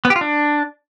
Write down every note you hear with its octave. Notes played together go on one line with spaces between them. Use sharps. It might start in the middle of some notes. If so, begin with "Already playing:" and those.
B3
G4
F4
D4